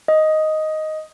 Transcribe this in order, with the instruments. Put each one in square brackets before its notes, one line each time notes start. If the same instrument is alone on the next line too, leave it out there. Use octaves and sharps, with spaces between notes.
[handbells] D#5